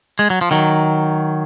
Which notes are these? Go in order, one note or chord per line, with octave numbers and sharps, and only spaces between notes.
G#3
F#3
F3
D#3 F#3